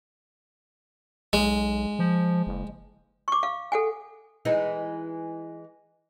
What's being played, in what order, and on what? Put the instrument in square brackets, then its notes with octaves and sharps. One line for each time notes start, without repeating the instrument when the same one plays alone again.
[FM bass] B1 [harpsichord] G#3
[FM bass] F3
F#1
[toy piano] C#6 D6
F5
A4 F#5 G#5
[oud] E3 G#3 D#4